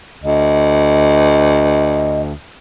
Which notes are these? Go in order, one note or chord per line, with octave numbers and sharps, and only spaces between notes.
D2 D#5